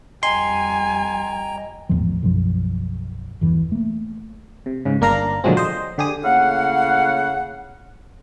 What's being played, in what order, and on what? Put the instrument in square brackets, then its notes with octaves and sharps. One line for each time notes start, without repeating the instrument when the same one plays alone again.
[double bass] F2 G3 [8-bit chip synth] D#5 G5 A#5 [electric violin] G#5 [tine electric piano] C6
[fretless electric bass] G#1 E2 A2 F3
B1 F#2 F3
G1 E2 E3
A3 A#3
[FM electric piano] C3
G#2 C#3
G1 A#3 D4 A#4 F5 A#5
A#2 D3 F3 F#3 G#3 C4
C5 D#5
D3 G4 G#4 D#6
[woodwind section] A2 C#3 A#3 F5 F#5